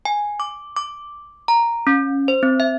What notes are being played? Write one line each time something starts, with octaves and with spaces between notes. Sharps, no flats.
G#5
D6
D6
A#5
C#4
C5
C4
E5